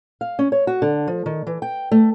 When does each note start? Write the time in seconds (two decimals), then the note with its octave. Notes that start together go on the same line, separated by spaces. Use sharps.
0.21 F5
0.39 C#4
0.52 C#5
0.67 F#4
0.82 D3
1.08 F3
1.26 D#3
1.47 E3
1.62 G5
1.92 A3